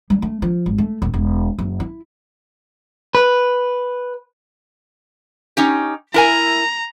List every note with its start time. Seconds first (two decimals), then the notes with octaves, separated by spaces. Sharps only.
0.10 G3
0.22 A3
0.42 F3
0.66 G#1
0.78 A3
1.02 D#1
1.14 E1
1.59 F#1
1.80 E4
3.15 B4
5.57 C#4 D#4 G4
6.14 E4 A#4 G#5 A#5